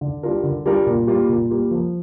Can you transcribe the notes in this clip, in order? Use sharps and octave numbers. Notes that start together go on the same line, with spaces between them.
D3
G3 D4 F4 A#4
D3
G3 D4 F4 A#4
A#2
G3 A#3 F4
A#2
G3 A#3 F4
F3